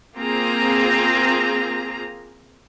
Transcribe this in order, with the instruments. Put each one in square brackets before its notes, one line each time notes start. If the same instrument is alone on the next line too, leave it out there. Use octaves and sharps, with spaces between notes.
[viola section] A#3 C4 F4 G#4 A#5